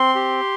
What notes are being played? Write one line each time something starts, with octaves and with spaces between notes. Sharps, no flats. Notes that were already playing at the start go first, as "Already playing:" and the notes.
Already playing: C4 C6
G4